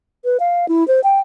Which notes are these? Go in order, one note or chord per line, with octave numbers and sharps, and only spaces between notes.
B4
F5
E4
C5
G5